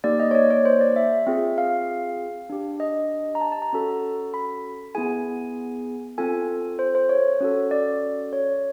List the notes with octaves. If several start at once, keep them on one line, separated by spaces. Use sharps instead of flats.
A#3 D#4 G4 D5
D#5
C#5
D5
C#5
C5
D5
E5
C4 F4 G#4
F5
D4 G4
D#5
A#5
A5
A5
A#5
C#4 F#4 A4
B5
B3 E4 G#4 G#5
C4 F4 A4 G#5
C5
C5
C#5
C#4 F#4 A4
D5
C#5